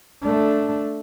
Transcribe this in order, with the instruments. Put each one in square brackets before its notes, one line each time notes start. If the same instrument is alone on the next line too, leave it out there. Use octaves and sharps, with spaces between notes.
[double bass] A3 D4